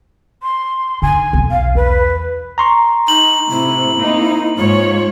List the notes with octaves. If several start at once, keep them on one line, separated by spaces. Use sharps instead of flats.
C6
D3 D#4 G#5
B1 E2
F5
E2 B4
A#5 C6 C#6
D#4 F#7
A2 C3 E4
A#3 C4 D#4
G#2 F4 C#5